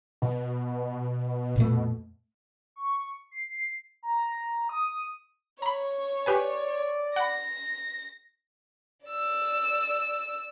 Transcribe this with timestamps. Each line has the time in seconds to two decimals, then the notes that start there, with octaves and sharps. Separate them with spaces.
0.22 B2
1.56 F2 A#2 A3
2.76 C#6
3.31 C7
4.03 A#5
4.69 D#6
5.62 C#5 A#5 B5
6.26 G4 B4 D5 G#5
7.16 F#5 B5 A#6
9.06 D5 E6